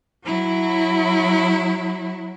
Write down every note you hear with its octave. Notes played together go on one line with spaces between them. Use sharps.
F#3 E4